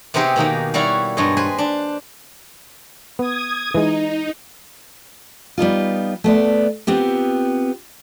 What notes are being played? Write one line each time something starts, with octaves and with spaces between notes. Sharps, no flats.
C3 B3 C4 D#4 G4 G#4
B2 D#3 A#3 D#4
G3 E4 F#4 C#5 F5 F#5
G2 G#3 C#5 D#5
B4 C5 G#5
D4
B3 D#6 G#6
E3 G#3 D#4
G3 B3 D#4 F4
A3 B3 D5
B3 C4 F4 G4